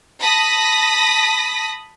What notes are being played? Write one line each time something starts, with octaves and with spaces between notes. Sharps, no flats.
A5 B5 D#6 A#6 B6